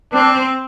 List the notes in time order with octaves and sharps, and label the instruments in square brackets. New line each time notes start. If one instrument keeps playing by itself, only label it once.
[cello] C4 [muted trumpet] D4